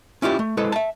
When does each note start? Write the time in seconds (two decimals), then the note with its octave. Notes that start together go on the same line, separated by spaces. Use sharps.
0.22 C#4 E4 F4 G4 D5
0.39 A3
0.57 G#3 E4 A4 B4 C5
0.72 E5 A5